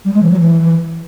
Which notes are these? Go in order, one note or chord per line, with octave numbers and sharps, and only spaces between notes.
G3
G#3
E3
F#3
E3